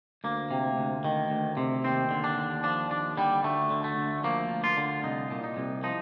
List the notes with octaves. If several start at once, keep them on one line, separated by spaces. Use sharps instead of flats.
D2 A#3
C3
D2
D#3
D2
C3
D#2 C4
D3
D4
D#2
F3 D4
D#2 D4
D3 G3
D2 A3
D3
A3
D2
F3 A#3
D2
F4
D3
C2 D#4
A#2
D#4
C2
F3 D#4